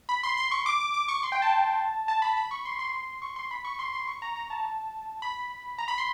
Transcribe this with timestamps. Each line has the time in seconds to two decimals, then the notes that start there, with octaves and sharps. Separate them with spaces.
0.09 B5
0.23 C6
0.37 C6
0.51 C#6
0.66 D6
0.80 D6
0.94 D6
1.08 C#6
1.23 C6
1.32 G5
1.42 A5
2.08 A5
2.22 B5
2.37 B5
2.51 C#6
2.65 C6
2.79 C6
3.22 C#6
3.36 C6
3.51 B5
3.65 C#6
3.79 C6
3.93 C6
4.08 C#6
4.22 A#5
4.36 A#5
4.50 A5
5.22 B5
5.78 A#5
5.88 B5
5.98 C6